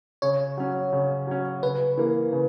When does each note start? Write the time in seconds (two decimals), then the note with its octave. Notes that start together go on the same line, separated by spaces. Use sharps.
0.22 C#3 C#5
0.57 F#3 C#4
0.93 C#3
1.27 F#3 C#4
1.63 C#3 B4
1.97 E3 A#3
2.33 C#3